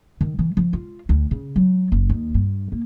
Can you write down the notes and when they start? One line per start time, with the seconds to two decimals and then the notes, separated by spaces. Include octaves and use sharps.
0.21 D#3
0.39 E3
0.57 F3
0.73 F4
1.09 D2
1.31 C#3
1.56 F#3
1.92 F#1
2.09 D#2
2.34 G2
2.72 A#3